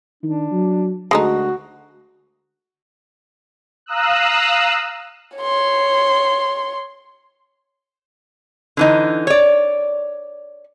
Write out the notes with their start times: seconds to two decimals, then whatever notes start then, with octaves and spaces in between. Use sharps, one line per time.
0.23 D#3 D4
0.52 F#3
1.11 D2 G#3 A3 D#4 F#4
3.86 F5 A#5 D#6 E6 F#6
5.37 C#5 C6
8.77 D3 E3 D#4
9.27 C#5 D5